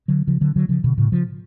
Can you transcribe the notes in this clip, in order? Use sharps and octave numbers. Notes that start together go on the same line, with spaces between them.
D3 F#3
C#3 F3
D3 F#3
D3 F#3
C#3 F3
B2 D3
A2 C#3
C#3 F3